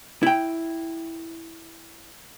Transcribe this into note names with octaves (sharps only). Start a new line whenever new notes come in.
E4 G5